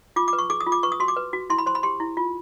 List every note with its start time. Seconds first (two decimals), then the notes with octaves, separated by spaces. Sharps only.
0.16 F4 D6
0.28 D6
0.33 B4
0.38 C#6
0.50 G#4 D6
0.61 D#6
0.67 F4
0.72 D6
0.83 B4 C#6
0.92 D#6
1.00 F#4 C6
1.08 D6
1.16 B4
1.33 F#4
1.50 E4 C6
1.58 B5
1.66 C5 C6
1.75 B5
1.83 G4 C6
2.00 E4
2.17 F4